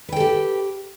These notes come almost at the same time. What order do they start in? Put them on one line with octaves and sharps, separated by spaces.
B4 G5 A4 G4